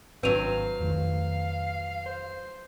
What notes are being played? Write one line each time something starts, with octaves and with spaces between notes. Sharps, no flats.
G#1 F#3 C4 D4 B4 F5 D#7 F7
F2 D#3 A3
C5